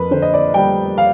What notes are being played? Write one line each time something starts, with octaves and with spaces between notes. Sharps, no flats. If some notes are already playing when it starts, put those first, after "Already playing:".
Already playing: F2 A#4 B4
D3 C5
D#5
D5
G3 G5
F5